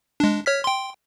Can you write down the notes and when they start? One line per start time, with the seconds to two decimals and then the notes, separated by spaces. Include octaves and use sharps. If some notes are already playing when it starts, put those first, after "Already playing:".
0.20 G#3 D4
0.46 C#5 F6 B6
0.64 G5 C6